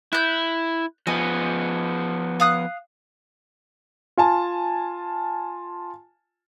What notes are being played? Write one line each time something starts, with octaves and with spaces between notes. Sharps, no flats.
E4 F#6 G6
F3 B3 D#5 G#5
F5 D#6 F#6
F4 G#5 A5